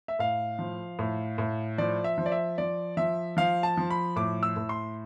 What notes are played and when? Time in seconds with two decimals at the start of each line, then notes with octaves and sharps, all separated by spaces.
0.08 E5
0.19 A2 F5
0.59 F3
0.99 A2
1.38 A2
1.78 F3 D5
2.04 E5
2.18 F3
2.26 D5
2.32 E5
2.58 F3 D5
2.97 F3 E5
3.37 F3 F5
3.63 A5
3.77 F3
3.90 B5
4.16 A2 D6
4.43 E6
4.56 A2
4.69 C6